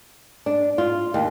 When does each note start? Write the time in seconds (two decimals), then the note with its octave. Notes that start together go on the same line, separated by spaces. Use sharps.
0.46 D4
0.78 F4
1.14 D#2